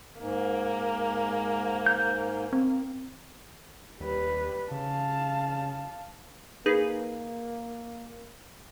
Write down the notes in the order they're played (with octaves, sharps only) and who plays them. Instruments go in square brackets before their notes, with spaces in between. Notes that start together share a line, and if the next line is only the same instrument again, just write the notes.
[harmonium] G#2 [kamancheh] A#3
[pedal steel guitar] G6
[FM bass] C4
[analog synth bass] D#2 [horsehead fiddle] G3 B4
[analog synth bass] C#3 [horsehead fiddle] F5 A5
[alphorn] A#3 [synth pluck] D#4 G#4 B4